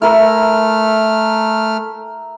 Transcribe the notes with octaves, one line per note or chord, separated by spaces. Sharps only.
A3 E4 A#4 F6